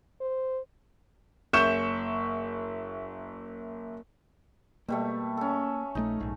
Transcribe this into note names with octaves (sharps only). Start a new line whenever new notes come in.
C5
F#1 E5 C#6 G6 C#7 E7
B2 G3 A3 A#3
C#4 A4
A#1 D#3 A3 D#4
A#1 G#2